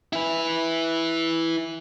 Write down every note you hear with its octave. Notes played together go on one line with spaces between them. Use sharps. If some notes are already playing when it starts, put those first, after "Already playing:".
E4 B4